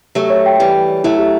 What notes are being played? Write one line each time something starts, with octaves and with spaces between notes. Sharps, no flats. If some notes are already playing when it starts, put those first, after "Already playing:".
F#3 A3 G4
C#5
G5
E3 G3 G4
G4
C#5
F#3 A3 E4
G4